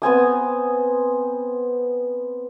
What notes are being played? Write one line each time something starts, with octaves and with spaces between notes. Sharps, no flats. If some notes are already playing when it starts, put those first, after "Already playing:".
B3 C4 G#5 D#6